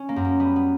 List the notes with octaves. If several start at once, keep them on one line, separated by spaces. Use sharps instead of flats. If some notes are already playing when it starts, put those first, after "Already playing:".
Already playing: C#4
A#3
F#2
A#3
G3 B3
B3